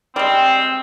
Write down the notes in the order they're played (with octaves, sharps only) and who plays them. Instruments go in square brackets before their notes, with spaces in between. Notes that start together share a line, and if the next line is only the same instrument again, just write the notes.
[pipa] G3 G#3 [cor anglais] C4